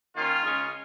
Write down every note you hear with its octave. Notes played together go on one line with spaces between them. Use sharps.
D#3 A#3 C#4 F4
C#3 G#3 C#4